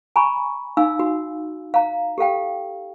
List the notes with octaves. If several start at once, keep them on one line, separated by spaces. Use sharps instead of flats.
G#5 A#5 B5 C#6
D#4 F5 G#5 E6
F#4
F5 A#5
G4 A4 F5 G5